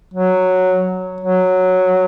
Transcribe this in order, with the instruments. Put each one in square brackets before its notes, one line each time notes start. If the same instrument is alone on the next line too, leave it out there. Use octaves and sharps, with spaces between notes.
[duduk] F#3
F#3